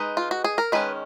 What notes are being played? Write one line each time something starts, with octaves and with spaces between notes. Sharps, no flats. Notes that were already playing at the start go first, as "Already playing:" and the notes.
Already playing: G#3 D#4 B4
F4
F#4
G#4
A#4
D#3 G#3 C#4 B4